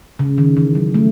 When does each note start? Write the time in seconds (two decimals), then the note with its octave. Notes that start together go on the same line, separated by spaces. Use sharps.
0.19 C#3
0.38 D#3
0.57 E3
0.75 F#3
0.94 A3